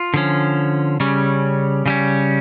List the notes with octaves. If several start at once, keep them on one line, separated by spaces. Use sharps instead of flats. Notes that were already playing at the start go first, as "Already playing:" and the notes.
Already playing: F4
D3 F3 C#4
C#3 G3 C#4
C#3 G3 C#4